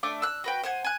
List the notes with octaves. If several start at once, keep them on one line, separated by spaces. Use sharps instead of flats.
A3 D4 D6
E6 F#6
F#4 B4 G5
C5 F#5 G#5
G#5 F#6